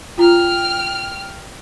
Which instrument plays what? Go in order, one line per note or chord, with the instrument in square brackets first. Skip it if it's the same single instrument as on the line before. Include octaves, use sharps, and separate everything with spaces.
[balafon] F4 A#5 [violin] G5 F6